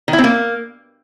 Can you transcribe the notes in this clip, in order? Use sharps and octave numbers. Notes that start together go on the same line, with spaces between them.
D#3
E4
C4
A#3